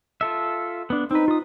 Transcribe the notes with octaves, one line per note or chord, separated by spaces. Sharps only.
F4 A4 E5
B3 D4
C4 D#4 B4
F4 D#6